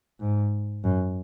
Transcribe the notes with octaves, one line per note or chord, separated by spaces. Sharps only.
G#2
F#2